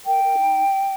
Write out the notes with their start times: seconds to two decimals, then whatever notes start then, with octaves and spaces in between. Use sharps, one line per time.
0.04 A#4 G5
0.21 A#4
0.37 D#4